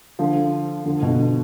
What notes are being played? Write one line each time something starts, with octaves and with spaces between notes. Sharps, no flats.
D3 F3
D3 F3
B2 D3